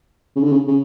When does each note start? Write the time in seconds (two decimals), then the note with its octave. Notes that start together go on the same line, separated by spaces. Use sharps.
0.36 C#3
0.43 D3
0.52 C#3
0.68 C#3